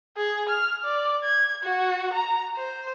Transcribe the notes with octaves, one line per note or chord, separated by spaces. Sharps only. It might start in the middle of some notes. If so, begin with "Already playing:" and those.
G#4
F6
D5
G#6
F#4
A#5
C5